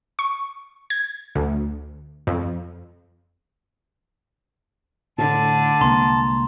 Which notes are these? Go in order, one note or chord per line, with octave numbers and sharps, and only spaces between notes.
C#6
G#6
D2
F2
A2 D3 A5
C2 G#3 A#3 A#5 C6